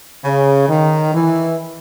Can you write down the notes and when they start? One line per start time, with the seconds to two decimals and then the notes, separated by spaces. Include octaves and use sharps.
0.24 C#3
0.69 D#3
1.14 E3